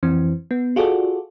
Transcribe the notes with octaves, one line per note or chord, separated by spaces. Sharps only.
F2 E3 C4
B3
F4 F#4 G#4 A4 D5